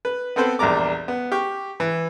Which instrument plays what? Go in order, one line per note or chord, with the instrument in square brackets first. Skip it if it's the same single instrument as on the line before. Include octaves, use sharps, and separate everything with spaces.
[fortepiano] B4
B3 C4 A4 B4 C5
A#1 E2 G3 A#5 D6
B3
G4 C#6
E3